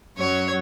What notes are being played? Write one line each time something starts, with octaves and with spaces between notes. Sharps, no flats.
F#2 F#3 C#5